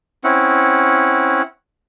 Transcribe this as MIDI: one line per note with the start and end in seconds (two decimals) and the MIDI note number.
0.24 1.42 60
0.24 1.42 61
0.24 1.42 64
0.24 1.42 78